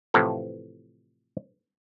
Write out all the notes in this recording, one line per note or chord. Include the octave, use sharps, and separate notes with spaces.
A2 C3 E3 F3 A4